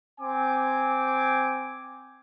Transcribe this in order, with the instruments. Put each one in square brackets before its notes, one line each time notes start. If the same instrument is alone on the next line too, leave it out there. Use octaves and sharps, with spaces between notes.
[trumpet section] C4 G#5 D6